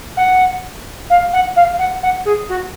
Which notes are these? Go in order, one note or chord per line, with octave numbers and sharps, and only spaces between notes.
F#5
F5
F#5
F5
F#5
F#5
G#4
F#4